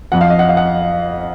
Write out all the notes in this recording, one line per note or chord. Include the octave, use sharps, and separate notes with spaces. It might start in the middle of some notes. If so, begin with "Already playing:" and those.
F2 F3 F#5
F5
D#5
F#5
F5
F#5